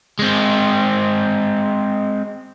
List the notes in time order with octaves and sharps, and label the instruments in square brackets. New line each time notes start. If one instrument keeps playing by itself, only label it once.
[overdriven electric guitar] G#3 C4